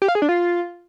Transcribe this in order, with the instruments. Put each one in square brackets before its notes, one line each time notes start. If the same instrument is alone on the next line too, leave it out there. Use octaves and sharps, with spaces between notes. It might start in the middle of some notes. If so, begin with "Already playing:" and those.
[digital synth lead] G4
F5
G#4
D4
F4